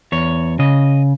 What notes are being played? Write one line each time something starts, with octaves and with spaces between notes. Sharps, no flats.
E2 C#5
C#3 D#5